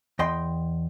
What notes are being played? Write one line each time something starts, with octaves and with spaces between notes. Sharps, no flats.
E2 D#5 G5 C6